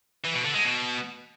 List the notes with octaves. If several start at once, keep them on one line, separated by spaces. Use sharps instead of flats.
E3
B2
D3
G#3
B2